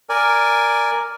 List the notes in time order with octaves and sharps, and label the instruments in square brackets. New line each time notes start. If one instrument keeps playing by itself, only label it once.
[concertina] A#4 D5 G#5